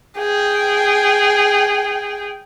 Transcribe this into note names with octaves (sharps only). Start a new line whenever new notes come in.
G#4 G5